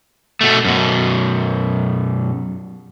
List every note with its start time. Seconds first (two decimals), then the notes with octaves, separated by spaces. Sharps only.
0.41 B2 A3
0.64 F#2 B2